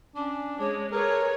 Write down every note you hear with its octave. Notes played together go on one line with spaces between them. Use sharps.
C#4 D4
G#3 C#5
G#4 A#4 B4 C#5